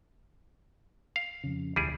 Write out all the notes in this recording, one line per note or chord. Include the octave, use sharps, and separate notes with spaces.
F5
F2 C#3
E1 D2 G3 E4 G#4